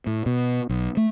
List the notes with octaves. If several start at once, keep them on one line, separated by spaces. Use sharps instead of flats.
A2
B2
B1
A3